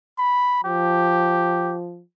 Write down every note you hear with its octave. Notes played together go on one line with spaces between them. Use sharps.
B5
F3 G4